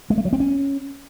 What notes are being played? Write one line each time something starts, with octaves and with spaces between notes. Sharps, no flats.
G#3
A3
F#3
C4
C#4